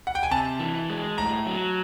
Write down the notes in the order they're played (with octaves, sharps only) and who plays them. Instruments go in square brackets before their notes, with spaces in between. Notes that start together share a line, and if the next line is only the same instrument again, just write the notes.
[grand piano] F#5
G5
G#5
[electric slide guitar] C3 [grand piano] A5
[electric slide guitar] E3
G#3
[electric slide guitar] A2 [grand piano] A#5
[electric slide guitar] F#3